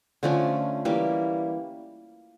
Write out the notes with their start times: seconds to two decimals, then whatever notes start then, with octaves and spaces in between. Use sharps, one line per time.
0.23 D3 F3 A3 C#4
0.85 E3 G3 A#3